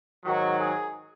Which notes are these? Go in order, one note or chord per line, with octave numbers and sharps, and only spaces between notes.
G#2 D#3 F#3 F#4
G#4